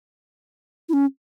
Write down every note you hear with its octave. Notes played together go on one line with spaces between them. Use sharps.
E4
C#4